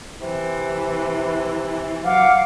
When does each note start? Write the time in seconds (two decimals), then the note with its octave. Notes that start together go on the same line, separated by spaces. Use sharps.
0.21 C3 E3
2.04 F#3 F5 F#5 D6